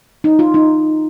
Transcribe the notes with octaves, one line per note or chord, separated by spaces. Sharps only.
D#4
F4
D#4